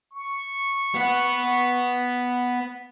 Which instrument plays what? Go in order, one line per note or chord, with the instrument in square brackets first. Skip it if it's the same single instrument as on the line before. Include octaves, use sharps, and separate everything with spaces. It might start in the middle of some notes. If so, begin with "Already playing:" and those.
[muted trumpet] C#6
[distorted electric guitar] B3 F#5